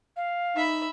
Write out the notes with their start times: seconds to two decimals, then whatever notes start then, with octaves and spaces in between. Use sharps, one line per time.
0.17 F5
0.56 D#4 E5 B5